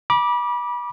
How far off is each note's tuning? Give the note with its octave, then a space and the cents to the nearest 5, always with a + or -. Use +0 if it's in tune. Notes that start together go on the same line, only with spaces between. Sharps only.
B5 -30 D6 +0